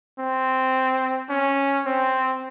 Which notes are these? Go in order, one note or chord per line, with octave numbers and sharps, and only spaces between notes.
C4
C#4
C4